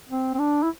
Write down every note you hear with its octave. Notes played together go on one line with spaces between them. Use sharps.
C4
C4
D4
E4